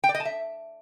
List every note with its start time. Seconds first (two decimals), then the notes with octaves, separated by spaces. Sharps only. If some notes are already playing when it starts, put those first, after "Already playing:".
0.04 G5
0.09 D5
0.15 D#5
0.20 A5
0.25 E5